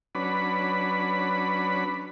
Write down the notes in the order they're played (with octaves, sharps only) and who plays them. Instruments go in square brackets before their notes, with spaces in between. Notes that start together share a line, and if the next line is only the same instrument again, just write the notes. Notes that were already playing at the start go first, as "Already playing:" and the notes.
[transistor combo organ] F#3 C#4 D4 B4 B5